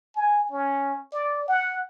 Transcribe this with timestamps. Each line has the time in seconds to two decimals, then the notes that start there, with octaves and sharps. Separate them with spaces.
0.16 G#5
0.51 C#4
1.13 D5
1.48 F#5